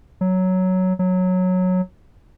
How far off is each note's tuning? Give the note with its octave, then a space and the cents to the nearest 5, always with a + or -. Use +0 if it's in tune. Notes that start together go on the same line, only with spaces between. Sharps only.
F#3 +5
F#3 -10